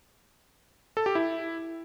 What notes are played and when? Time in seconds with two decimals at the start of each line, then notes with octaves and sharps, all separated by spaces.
0.97 A4
1.06 G4
1.15 E4